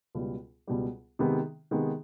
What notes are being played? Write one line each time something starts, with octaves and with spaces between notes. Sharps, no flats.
C#2 B2 G3
C#2 B2 G3
C3 D#3 G#3 B3
C3 D#3 G#3 B3